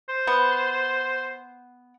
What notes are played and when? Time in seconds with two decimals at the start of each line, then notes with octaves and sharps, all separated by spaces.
0.09 C5
0.27 B3